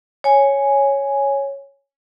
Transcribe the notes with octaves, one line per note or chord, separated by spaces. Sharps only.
C#5 G#5